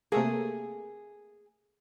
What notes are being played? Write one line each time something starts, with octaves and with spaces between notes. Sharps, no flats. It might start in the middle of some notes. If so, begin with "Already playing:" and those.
C3 A3 A#3 G#4